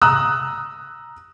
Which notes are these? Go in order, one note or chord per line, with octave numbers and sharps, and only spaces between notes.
A#5 D#6 E6 F#6